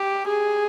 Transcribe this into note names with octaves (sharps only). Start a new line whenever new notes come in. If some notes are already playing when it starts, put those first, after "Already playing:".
Already playing: G4
G#4